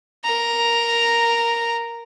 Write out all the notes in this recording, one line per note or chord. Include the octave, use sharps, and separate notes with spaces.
A#4 A#5